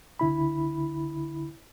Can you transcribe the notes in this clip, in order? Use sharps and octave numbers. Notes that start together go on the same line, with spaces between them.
C#2 D3 E4 B5